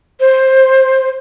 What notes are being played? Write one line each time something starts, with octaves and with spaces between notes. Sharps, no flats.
C5